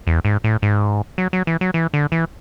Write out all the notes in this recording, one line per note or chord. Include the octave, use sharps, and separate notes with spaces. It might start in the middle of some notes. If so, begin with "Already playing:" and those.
E2
G#2
A2
G#2
F#3
F#3
E3
F#3
E3
D3
E3